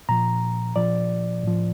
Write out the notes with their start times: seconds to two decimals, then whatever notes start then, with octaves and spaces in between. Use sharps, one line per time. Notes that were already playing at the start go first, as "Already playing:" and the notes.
0.09 A#2 F3 A#5
0.76 A#2 F3 D5
1.43 A2 F3